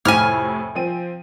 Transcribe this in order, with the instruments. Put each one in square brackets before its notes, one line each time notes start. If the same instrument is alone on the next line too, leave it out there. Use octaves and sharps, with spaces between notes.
[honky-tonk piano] F2 A2 C3 [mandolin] G#5 F6
[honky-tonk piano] F3 C4 D#7